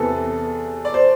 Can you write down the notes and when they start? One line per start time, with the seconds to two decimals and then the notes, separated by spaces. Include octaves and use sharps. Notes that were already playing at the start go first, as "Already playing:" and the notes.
Already playing: E2 C3 E3 A4
0.85 D5
0.94 C5